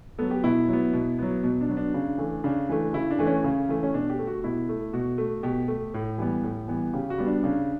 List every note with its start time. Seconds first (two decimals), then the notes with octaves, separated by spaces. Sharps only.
0.18 F#3 B3 A4
0.31 G4
0.44 B2 E4
0.69 F#3 B3
0.93 B2
1.18 F#3 B3
1.43 B2
1.61 D4
1.69 F#3 B3
1.77 D4
1.94 C#3
2.18 E3 A3
2.44 C#3 D4
2.69 E3 A3
2.93 C#3 E4
3.11 D4
3.19 E3 A3
3.27 C#4
3.44 C#3
3.69 E3 A3
3.83 C#4
3.94 B2 D4
4.10 G4
4.19 A3
4.27 F#4
4.44 B2 E4
4.69 A3
4.93 B2 F#4
5.18 A3
5.43 B2 G4
5.68 A3
5.94 A2
6.18 E3 G3 B3
6.43 A2
6.68 E3 G3 B3
6.93 C#3 G4
7.10 F#4
7.18 G3 B3
7.27 D4
7.43 C#3 D4